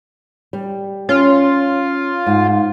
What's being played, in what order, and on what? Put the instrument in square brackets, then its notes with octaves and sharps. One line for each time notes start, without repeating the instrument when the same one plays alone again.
[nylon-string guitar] G3
[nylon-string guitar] C#4 [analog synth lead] F4
[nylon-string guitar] G#2